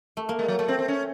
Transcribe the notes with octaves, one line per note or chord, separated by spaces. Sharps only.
A3
A#3
G#3
F#3
F#3 A3
C4
C4
C#4